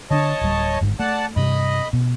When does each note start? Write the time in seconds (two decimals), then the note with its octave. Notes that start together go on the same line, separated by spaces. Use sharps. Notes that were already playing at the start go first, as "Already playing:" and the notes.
0.11 D3 D4 C#5 D#5 A5
0.41 D1 G3
0.81 G1 G#2
1.00 A3 D5 F#5 A5
1.36 G2 C3 G3 D#5 B5
1.93 B2